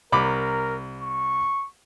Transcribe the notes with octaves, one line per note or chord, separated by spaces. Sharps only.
C2 A#4 B5 D6
C#6